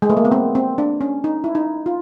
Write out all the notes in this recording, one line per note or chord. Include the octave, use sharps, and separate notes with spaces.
G#3
A3
A#3
B3
C4
C4
D4
C#4
D#4
E4
D#4
F4